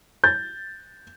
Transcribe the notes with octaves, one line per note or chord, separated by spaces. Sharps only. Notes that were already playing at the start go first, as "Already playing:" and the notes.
G6 A6